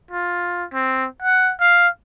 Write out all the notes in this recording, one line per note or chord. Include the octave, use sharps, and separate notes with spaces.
F4
C4
F#5
F5